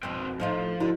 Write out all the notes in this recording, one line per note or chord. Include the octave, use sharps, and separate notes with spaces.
F2 B2 C4 B4 G5
A2 F3 D#4 F4
D3 E4 F#4 D#5